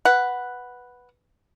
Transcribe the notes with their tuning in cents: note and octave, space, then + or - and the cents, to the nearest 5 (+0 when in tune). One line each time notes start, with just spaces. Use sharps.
B4 +0 F#5 +0